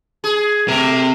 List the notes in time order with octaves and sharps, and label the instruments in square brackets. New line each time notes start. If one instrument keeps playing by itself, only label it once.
[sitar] G#4
[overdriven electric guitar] C3 [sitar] A3 A#4